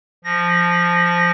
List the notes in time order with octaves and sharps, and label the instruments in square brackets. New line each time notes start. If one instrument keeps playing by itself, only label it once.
[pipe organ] F3 A#6